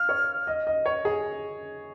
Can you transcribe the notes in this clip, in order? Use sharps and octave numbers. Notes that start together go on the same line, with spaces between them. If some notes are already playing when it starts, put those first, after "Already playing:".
Already playing: F5 F6
C#5
D#5
D#5
C#5
G#4